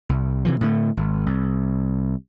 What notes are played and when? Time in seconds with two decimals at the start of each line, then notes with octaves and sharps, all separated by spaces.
0.09 C2
0.45 C3 E3 F3
0.61 A2 D3 G#3 A3
0.97 G#1
1.26 C2